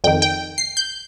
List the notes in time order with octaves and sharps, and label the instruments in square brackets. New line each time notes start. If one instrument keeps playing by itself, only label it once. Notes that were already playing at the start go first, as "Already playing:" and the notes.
[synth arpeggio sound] F2 D#3 G5
G5
C7
G6